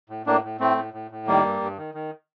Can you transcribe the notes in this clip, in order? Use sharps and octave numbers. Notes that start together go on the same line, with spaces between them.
A2
A2 A#3 D4
A2
A2 A3 C4
A2
A2
A2
D#3 G3 A#3
G2
G2
D#3
D#3